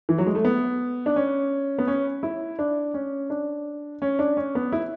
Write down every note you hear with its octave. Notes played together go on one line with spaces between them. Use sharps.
E3
F#3
G#3
A3
B3
D4
C#4
B3
C#4
E4
D4
C#4
D4
C#4
D4
C#4
B3
E4